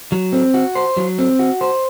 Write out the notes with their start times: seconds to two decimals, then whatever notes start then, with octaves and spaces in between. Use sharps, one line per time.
0.12 F#3
0.32 C4
0.54 F#4
0.75 C5
0.97 F#3
1.19 C4
1.39 F#4
1.61 C5